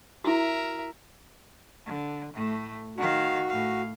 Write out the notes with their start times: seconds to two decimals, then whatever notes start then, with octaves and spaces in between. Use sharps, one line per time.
0.24 E4 F#4 A#4 E5
1.86 D3
2.33 A2 A3
2.97 D#3 F#4 F5
3.48 A2 F5